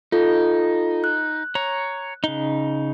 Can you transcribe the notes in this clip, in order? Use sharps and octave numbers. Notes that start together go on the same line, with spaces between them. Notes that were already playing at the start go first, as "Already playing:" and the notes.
D#4 F4 A4
F#6
C#5 A#5
C#3 D#4